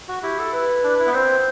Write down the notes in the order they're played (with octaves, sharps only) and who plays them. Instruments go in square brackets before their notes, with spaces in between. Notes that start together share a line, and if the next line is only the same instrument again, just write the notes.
[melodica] F#4
[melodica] E4 [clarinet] G4
[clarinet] A4
B4
[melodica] D4
E4
B3
[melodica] C4 [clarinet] C5